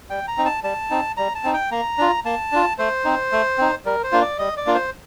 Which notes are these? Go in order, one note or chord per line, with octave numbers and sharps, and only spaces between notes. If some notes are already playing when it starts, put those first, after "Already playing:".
G3 G5
A#5
C4 D#4
A5
G3 A5
C4 D#4
G3 A#5
A5
C4 D#4
G5
A#3 A#5
D4 F4
A#3 A5
D4 F4
A3 C5
C4 D#4
A3
C4 D#4
G3 A#4
C5
A#3 D4 F4
D5
G3 D#5
D5
A#3 D4 F4
C5